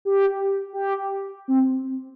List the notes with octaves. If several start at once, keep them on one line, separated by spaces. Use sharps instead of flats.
G4
G4
C4